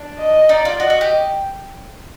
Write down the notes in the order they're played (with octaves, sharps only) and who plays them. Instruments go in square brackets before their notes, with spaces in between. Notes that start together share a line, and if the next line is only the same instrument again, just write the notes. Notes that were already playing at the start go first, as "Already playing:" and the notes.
Already playing: [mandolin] D4
[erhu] D#5
[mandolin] D#4 [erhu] D5
[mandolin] F4
[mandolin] F#4 [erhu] D#5
[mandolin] F#4
G4